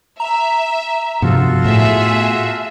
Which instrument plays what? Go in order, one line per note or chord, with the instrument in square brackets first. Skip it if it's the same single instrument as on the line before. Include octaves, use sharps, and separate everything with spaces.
[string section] E5 [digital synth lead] A#5
[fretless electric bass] G2 C3 F3 [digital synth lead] B3 [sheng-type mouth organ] F4 F#4 A4
[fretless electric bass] A2 [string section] G#4 E5